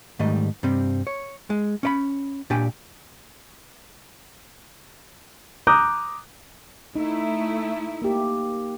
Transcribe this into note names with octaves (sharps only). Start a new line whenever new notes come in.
G#2 D#3 G3 A3 D#5
G2 C3 G3 C4
C#5
G#3
C#4 D5 B5
A#2 D4 G4 G5 G#5
A#5 D6 D#6 F#6 G6
A3 D#4 E4
A#3 G4